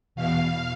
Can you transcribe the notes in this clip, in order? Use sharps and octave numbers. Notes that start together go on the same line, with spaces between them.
E2 B2 F5